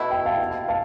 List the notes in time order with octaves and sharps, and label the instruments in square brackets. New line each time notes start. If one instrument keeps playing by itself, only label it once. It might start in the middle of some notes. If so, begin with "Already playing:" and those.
Already playing: [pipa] B2 A3 E4
[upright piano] G5 B5
F5 A5
F5 A5